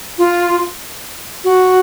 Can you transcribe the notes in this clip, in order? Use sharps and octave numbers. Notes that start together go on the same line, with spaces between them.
F4
F#4